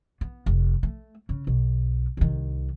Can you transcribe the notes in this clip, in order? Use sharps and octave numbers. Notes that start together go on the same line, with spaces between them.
B3
F1
A3
C#3
B1
C2 D#3